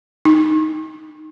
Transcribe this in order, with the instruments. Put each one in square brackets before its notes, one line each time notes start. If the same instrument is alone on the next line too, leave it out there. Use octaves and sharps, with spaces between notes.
[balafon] D#4